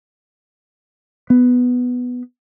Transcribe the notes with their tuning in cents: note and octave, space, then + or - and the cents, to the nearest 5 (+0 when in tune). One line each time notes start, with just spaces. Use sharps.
B3 +5